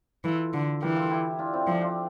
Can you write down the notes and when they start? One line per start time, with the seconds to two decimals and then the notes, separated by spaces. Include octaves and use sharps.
0.24 E3 F4 A4
0.54 D3
0.82 E3 G4 A#4
0.96 F4 A4
1.10 E4 G4
1.39 D4 F4
1.53 C4 E4
1.67 F3 D4 F4
1.81 D4 F4